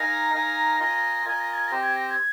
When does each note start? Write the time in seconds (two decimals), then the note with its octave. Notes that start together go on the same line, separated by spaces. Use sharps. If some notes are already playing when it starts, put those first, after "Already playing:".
Already playing: D#4 A#4 F5 G#5 A#6
0.34 D#4 A#4 F5 G#5
0.80 F4 A#4 D#5 G#5
1.26 F4 A#4 D#5 G#5 G#6
1.40 A#6
1.54 G#6
1.68 C4 G4 C5 A#6
1.82 G#6
1.96 A#6
2.10 G#6